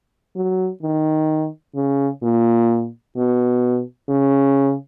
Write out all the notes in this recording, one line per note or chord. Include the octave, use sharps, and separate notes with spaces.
F#3
D#3
C#3
A#2
B2
C#3